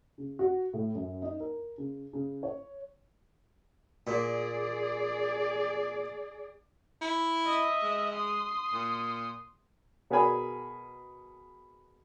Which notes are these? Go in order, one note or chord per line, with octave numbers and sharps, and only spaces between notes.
C#3
F#4
A2
F#2
D#4
A#4
C#3
C#3
C#5
A#2 G#4 D5
E4
D#5 E5
G#3
C6 D#6
A#2
B2 B3 G#4 A#4 G#5 B5